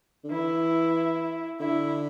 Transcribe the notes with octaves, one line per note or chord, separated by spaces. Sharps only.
D3
E3 E4
D3 E4